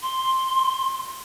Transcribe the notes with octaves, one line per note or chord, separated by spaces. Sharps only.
C6